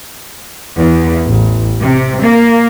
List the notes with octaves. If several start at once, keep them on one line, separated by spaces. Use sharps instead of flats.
E2
A1
C3
A#3